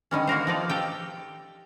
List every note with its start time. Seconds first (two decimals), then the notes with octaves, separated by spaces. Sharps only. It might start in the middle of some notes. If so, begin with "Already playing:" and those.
0.11 D3 D#3 G3 C#4
0.27 A#3 F#4 A#4 C5
0.47 F3 D#4 D5
0.69 G4 A4 G5